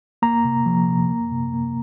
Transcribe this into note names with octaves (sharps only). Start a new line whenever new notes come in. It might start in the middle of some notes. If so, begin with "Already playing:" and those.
A#3 A#5
C3
F3
C3
A#3
C3
A#3